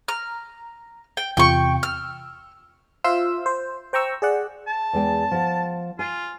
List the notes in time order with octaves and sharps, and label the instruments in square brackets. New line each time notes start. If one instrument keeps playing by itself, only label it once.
[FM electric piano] A#5 [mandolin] F6
[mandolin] G5
[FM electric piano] E2 C3 F4 [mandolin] G5 C#6
[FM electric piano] E6 [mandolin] F6
[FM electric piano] F4 C5 E5 F5 C6 E6
C5
C5 G5 A#5 C#6 E6
G#4 D5 F#5
[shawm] A5
[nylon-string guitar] E2 G#3 G5
F3 F#5
[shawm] F4 [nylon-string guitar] G#5